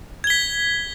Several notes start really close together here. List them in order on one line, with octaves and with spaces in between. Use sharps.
G#6 G7 B6